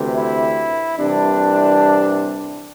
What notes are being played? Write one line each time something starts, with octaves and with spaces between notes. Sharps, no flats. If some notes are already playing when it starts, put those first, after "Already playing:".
Already playing: D2 C3 E3
E4
C2 C3 E3 D4